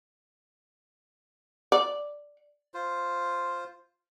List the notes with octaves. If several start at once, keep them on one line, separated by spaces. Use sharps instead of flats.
D5
F4 C5